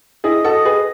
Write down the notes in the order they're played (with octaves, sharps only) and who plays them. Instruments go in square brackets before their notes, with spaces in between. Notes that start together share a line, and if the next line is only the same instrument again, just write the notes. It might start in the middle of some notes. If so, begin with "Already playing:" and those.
[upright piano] E4 G#4 [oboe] D#5
[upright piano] F#4 A4
[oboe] D#5
[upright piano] G#4 B4